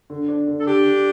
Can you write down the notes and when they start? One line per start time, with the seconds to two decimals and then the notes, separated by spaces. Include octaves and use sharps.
0.10 D3
0.28 D4
0.47 D3
0.60 A4
0.65 D3 D4 G4
0.83 D3